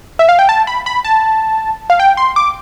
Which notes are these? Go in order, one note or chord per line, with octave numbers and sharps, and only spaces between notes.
E5
F5
G5
A5
B5
B5
A5
F5
G5
C6
D6